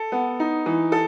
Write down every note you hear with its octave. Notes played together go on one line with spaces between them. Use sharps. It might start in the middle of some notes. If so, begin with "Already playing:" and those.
Already playing: A4
B3
D#4
E3
A4